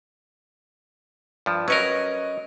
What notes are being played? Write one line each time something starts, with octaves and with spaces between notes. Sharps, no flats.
G2 F3
F#3 C#4 A#4 B4 D#5